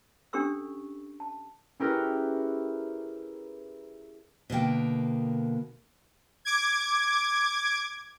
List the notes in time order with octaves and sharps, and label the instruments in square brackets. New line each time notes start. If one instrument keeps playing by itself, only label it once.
[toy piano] C#4 D4 G4 A4 C#6 E6
A5
[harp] C#4 E4 G4 G#4 A#4 B4
[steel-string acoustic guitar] B2 D3 A#3 G5
[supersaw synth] D6 G#6